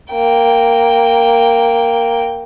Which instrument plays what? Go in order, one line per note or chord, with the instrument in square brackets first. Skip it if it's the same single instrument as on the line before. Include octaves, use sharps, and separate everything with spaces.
[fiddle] A#3 G5